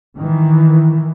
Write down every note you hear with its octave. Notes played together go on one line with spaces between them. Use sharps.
D#3 E3